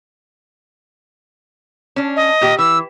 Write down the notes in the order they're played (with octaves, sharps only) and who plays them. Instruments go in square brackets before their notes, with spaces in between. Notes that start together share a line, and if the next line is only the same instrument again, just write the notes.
[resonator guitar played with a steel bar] C#4 D4
[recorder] D#5
[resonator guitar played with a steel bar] A#2 G4
[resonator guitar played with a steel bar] E3 [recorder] E6